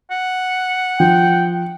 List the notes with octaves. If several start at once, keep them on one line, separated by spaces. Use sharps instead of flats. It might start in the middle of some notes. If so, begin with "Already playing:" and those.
F#5
F3 G5